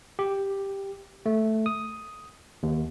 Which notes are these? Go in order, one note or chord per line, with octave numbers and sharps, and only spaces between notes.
G4
A3
D#6
D#2